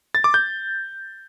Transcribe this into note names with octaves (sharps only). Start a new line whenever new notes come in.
A6
D6
G6